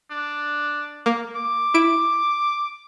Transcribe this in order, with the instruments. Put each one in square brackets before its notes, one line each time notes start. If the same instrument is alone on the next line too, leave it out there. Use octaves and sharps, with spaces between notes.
[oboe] D4
[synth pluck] A#3
[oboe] D6
[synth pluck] E4 D7